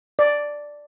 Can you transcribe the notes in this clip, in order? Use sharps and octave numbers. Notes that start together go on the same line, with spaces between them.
D5